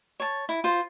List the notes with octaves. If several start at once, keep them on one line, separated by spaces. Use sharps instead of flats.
C#5 A5
E4
F4 C5